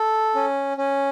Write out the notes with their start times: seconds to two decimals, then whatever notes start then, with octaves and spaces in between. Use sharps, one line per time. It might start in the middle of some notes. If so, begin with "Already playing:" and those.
Already playing: A4
0.35 C#4
0.77 C#4